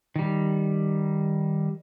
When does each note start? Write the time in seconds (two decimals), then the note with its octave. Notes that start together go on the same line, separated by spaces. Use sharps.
0.16 D#3 G3